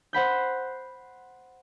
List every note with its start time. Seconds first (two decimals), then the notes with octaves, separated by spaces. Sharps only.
0.13 C5 F#5 B5 G6